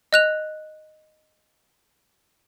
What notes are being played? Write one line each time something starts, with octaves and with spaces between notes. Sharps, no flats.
D#5 F#6 F7